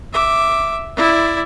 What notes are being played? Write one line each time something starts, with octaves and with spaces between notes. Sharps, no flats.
E5 D6
E4 D5